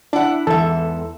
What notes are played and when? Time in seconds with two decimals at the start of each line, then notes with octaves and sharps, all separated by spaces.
0.13 D4 E4 F#5
0.47 E2 G#2 E3 A4 E5